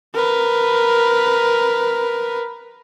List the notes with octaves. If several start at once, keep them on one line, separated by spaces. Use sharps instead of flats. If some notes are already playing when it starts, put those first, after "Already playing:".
A#4 B4